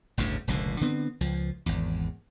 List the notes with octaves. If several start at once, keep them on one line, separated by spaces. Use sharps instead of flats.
G1 D2 A2 C#3
F1 C#2 A#2 D3
D3 B3 C4
C#2 F3
G#1 E2